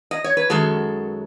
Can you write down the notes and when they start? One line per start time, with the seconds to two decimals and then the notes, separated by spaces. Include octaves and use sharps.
0.11 D#5
0.24 C#5
0.37 B4
0.50 F#2 D#3 G#3 F#4 A4